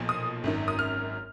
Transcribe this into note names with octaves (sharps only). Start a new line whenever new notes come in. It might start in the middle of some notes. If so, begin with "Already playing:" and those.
Already playing: B1 A#2 F3
D#6
G#1 F#2 D#3
D#6
F6